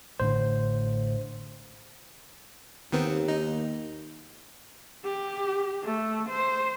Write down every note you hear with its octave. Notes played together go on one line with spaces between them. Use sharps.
A1 A2 D3 C5
D#2 D#3 B3 C4
D#4
G4
A3
C5